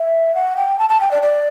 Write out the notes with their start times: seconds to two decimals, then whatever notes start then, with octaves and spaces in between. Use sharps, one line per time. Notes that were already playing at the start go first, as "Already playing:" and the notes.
Already playing: E5
0.35 F#5
0.57 G5
0.79 A5
0.89 A5
1.01 G5
1.11 D5
1.22 D5